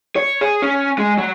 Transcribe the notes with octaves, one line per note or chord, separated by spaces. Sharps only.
C#5
G#4
C#4
G#3
F#3